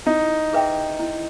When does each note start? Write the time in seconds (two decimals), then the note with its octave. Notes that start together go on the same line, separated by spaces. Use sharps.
0.06 D#4 E4
0.53 G#4 B4 E5 G5
0.99 E4